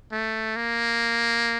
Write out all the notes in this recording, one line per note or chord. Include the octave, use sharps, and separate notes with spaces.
A3
A#3